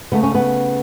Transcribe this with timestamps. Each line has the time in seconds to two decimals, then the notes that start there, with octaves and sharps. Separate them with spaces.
0.12 C#3 A3 B3
0.23 C#4
0.35 B3